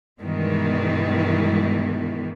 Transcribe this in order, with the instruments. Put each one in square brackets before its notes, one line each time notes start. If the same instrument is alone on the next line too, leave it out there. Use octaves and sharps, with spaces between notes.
[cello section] G2 B2 D#3 E3 G#3 B3